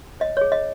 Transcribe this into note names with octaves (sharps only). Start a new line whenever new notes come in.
C#5 D#5
C#5
G#4
D#5